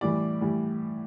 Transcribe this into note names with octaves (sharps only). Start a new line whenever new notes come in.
A2 E3 G3 D5
A2 E3 G3